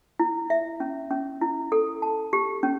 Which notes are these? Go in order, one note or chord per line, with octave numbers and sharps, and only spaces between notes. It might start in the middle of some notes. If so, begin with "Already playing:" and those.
E4
E5
C#4
C#4
E4
A4
A5
G4
C#4